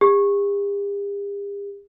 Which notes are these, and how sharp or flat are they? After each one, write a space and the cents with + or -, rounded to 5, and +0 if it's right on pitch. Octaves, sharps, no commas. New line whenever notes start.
G4 +45